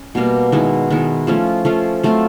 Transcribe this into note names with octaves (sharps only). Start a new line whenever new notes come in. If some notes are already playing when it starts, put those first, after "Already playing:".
Already playing: C#4
B2 G3 A#3
D#3 G#3 B3 E4
D#3 G#3 B3 E4
F3 A3 C#4 F4
F3 A3 C#4 F4
F#3 A3 C4 F4